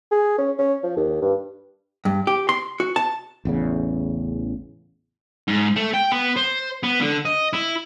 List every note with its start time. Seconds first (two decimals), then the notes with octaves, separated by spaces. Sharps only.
0.11 G#4
0.38 C#4
0.59 C#4
0.83 F3
0.97 D#2
1.22 G2
2.05 G2
2.27 G4
2.49 C6
2.80 F#4
2.96 A5
3.45 A1 E2 C#3
5.48 G#2
5.76 A3
5.94 G5
6.12 B3
6.36 C5
6.83 B3
7.01 D3
7.25 D#5
7.53 E4